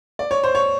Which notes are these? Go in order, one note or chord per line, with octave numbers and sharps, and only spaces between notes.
D5
C#5
C5
C#5